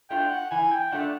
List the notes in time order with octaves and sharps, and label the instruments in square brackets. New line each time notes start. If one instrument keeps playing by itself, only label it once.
[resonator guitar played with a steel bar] A3 D4 F4 [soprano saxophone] G5
[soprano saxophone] F#5
[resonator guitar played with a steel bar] E3 [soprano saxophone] G#5
[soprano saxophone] G5
[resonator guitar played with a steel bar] A3 D4 F4 [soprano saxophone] F#5